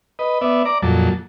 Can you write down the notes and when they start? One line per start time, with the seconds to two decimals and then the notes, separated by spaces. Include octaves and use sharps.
0.19 B4 D#5
0.41 B3 D5 E5
0.65 D5 A#5 D6
0.82 F2 A#2 F#3 A5